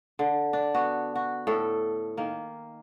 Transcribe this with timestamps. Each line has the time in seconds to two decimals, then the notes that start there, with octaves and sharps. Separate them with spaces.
0.19 D3
0.53 D4
0.74 B3 F#4
1.15 F#4
1.47 A2 A4 G5
2.17 D#3 A#3